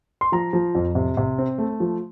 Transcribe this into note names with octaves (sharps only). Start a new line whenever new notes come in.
C6
F3 A#5
F3
F2
C3
C3
C4
A3
F3